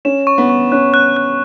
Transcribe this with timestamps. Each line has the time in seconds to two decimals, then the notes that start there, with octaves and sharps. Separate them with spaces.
0.05 C#4 E7
0.27 C#6
0.38 B3
0.50 C#6
0.72 C#4 F#6
0.94 F#6
1.17 F#6